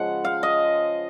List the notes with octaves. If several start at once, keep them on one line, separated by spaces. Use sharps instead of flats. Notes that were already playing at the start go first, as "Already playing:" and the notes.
Already playing: C#3 F3 G#3 F#5
F5
D#5